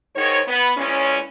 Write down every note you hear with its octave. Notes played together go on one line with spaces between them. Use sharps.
G#2 D#3 C#5
B3
A#2 E3 G#3 C#4